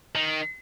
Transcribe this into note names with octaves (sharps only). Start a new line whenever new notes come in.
D#3